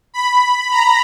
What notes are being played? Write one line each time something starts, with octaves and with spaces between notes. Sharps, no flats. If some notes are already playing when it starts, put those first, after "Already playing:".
B5
A#5